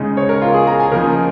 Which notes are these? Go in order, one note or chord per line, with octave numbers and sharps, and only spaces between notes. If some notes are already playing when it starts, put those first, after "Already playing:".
Already playing: C#3 G#3 D#4
C#5
A#4
F4
G#4
A#5
G#5
C#3 F3 A#3 D#4 A#4